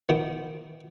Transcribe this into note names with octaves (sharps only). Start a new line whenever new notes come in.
D#3 B3